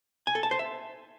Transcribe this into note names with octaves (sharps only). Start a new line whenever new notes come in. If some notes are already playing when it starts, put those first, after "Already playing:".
G#5
A4
A5
C5
E5